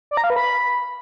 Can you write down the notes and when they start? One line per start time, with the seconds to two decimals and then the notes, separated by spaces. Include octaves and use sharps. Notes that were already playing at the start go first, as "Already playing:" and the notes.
0.11 D5
0.17 A#5
0.24 F5
0.30 B4
0.36 B5